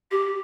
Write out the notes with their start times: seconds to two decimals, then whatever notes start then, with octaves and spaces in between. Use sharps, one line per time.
0.12 G4